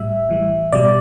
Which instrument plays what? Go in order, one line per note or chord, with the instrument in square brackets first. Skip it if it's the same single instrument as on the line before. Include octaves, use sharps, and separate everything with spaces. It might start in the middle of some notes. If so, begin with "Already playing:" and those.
Already playing: [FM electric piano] A2 G3 E5
A2 E3 G3
B2 G3 D5